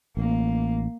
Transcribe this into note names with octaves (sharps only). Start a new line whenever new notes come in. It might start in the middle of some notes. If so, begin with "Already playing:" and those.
A1 A#3